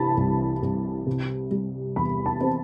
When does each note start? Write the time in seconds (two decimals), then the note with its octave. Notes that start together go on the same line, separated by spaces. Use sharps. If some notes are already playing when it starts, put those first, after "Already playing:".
Already playing: C3 E3 A5 B5
0.17 C2
0.62 C2
1.07 C3
1.51 G3
1.96 E2 B5
2.26 A5
2.41 C4